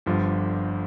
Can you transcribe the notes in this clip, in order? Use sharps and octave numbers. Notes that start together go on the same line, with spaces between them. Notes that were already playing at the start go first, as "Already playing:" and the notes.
G1 G2 D3 F3